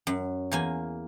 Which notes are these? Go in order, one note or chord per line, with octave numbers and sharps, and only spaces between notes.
F#2
E2 A#3 G#5